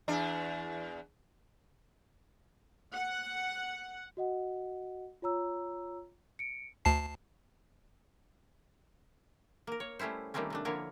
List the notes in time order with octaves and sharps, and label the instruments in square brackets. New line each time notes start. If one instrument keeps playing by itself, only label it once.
[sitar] E2 D4
[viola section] F#5
[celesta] F#4 D#5 F#5
F4 C#5 A#5 E6
C#7 D7
[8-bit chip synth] D2 A5 C7
[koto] A#3 A#4
C#5
G3 A3 C#4 E4 C5
D#3 G3 A3 A#3 C4 C#4
C3 A3 D4
D3 F3 A#3 E4 A#4 C#5